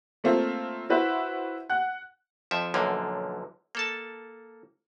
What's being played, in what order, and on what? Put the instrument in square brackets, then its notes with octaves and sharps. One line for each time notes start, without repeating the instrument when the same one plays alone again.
[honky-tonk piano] A3 A#3 C4 F4
E4 F#4 B4 C5 E5
F#5 F#6
[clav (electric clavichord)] F2 F3 E5
B1 F#2 D3 F3 A#3
A#3 A4 A5